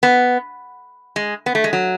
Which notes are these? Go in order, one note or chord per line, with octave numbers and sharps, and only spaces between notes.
B3
G#3
B3
A3
G#3
F#3